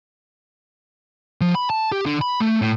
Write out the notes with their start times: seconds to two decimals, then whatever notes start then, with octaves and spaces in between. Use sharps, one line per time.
1.41 F3
1.55 B5
1.70 A5
1.92 G4
2.06 D3
2.21 B5
2.40 A3
2.62 A2